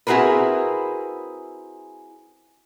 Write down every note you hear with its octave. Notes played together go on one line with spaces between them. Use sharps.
C4 E4 F#4 G#4 A#4 B4